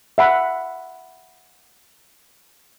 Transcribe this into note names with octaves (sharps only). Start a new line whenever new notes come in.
E5 F#5 B5